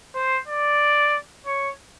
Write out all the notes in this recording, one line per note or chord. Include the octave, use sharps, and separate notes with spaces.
C5
D5
C#5